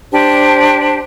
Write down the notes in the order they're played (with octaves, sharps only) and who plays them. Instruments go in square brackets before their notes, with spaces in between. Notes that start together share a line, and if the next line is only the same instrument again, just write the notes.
[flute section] D4 G4 C5